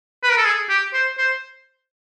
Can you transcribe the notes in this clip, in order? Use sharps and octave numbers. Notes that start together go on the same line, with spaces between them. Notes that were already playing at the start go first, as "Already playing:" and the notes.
B4
A#4
A4
G#4
G4
C5
C5